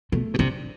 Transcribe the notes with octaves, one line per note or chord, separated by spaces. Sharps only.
B2 A3
B2
C3 D4